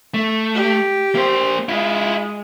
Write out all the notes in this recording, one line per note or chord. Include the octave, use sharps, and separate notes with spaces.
A3
G4
A#3 C5
G#3 E4 F4